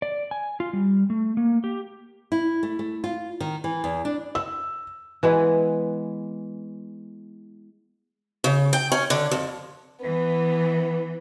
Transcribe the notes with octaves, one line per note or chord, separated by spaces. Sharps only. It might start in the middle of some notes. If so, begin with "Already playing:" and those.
D5
G#5
F4
G3
A3
A#3
G4
E4
A3
A3
F4
D#3
E3
E2
D4
E6
E3 G#3 B3
C#3
G5
C#4
D3
F2
E3 B3